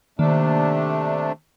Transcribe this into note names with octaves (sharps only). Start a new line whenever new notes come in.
C3 D#3 A3 A#3 D4